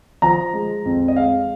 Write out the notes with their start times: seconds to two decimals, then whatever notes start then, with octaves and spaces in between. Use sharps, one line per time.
0.22 F3 A#5
0.54 G#3
0.85 F2
1.08 D#5
1.16 G#3 F5